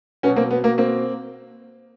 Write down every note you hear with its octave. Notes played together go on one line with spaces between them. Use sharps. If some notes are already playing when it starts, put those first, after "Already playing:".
B2 F#3 B3 C#4
A#3 C4
B3
A#3
A#3 C4